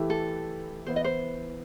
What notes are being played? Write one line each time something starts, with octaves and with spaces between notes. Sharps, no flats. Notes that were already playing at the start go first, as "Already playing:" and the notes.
Already playing: E3 A3 E4 G4
A4
E3 B3 E4 B4 C5
D#5
C5